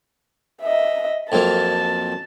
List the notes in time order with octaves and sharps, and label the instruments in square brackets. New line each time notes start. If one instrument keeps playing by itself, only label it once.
[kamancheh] D#5 E5
[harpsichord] F2 F#3 A#3 [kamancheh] A5